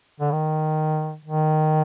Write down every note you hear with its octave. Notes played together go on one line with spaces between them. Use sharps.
D3
D#3
D#3